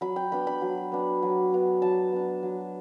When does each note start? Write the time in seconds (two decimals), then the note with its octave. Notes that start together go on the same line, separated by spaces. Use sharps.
0.01 F#3 B5
0.16 G5
0.32 B3 D4 B5
0.47 B5
0.61 F#3
0.92 B3 D4
1.23 F#3
1.52 B3 D4
1.82 F#3 A5
2.12 B3 D4
2.43 F#3